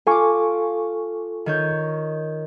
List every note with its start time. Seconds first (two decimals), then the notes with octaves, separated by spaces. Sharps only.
0.07 F4 A4 G#5 C#6 D6
1.46 D#3 C#5 G6